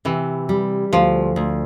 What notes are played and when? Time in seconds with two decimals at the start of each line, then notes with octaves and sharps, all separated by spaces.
0.05 C3 E3
0.49 G3
0.93 D2 F3
1.36 D2